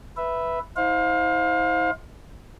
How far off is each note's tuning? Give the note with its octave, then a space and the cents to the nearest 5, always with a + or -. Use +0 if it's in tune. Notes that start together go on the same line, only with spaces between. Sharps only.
B4 +0 E5 +0
E4 -45 C5 +0 F5 +30